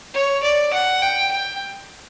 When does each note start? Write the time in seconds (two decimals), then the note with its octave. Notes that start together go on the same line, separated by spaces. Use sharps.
0.14 C#5
0.43 D5
0.74 F#5
1.02 G5
1.32 G5